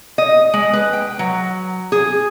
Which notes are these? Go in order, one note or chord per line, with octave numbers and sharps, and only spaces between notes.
D#5
G#3
B4
G5
F#3
G#4